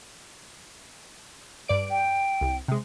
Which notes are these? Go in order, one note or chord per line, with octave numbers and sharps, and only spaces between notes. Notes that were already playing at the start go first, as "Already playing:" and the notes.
G2 D5 D7
G5
C2
C3 G#3